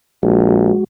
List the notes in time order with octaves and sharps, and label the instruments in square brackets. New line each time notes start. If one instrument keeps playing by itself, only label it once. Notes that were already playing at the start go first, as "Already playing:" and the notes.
[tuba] A#1 [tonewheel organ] G#3 F#4